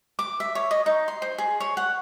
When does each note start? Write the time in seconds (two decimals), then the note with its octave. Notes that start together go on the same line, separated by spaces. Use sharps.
0.19 D6
0.40 E5
0.55 C#5
0.71 D#5
0.86 D#4
1.08 C6
1.22 C5
1.38 G#4
1.60 C#5
1.77 F#5